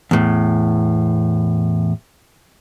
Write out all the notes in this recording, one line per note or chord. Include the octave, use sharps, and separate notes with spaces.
E2 A2